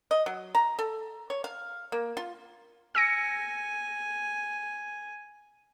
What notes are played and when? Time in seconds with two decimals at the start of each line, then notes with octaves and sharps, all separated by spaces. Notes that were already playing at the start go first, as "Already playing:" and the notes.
0.11 D#5
0.26 F#3
0.55 A#5
0.79 A4
1.30 C#5
1.44 F5
1.92 A#3
2.17 F4
2.95 G#5 E6 A#6 C#7